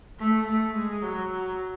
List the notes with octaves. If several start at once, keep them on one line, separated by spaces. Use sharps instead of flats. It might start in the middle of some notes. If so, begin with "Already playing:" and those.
A3
A3
G#3
F#3